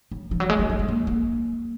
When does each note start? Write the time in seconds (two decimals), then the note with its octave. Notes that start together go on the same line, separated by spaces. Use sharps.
0.11 F#3
0.31 F3
0.40 F#3
0.50 G#3
0.59 F#3
0.70 F#3
0.79 G#3
0.89 A#3
1.07 A#3